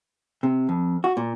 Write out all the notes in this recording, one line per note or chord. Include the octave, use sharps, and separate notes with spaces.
C3
F2
F#4
A#2